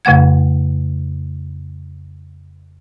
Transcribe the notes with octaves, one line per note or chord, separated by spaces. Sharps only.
F2 C#3 A3 F#5 G#6